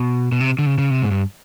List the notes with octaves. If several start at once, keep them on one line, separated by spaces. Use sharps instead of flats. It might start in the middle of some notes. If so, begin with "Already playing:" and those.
Already playing: B2
B2
C3
D3
C#3
C#3
C3
G#2
G2